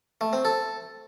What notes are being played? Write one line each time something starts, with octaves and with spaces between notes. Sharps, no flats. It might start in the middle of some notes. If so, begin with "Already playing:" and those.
A3
C4
A4